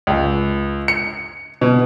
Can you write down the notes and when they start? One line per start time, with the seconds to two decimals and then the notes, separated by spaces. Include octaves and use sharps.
0.07 C#2
0.88 C#7
1.61 B2